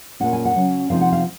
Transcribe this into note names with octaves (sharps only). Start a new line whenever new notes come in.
A#2 G#3 C#4 F#5
G#5
F#5
C#3 F#3 C#4
C3 F3 G#3 C4 D#4 F5
F#5
F5